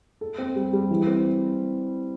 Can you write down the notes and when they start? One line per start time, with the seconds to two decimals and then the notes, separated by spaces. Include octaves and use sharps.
0.21 A4
0.38 C4
0.56 G3
0.73 G3
0.91 E3
1.07 C4